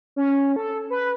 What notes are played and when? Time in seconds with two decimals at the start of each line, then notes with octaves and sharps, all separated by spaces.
0.16 C#4
0.56 A4
0.90 B4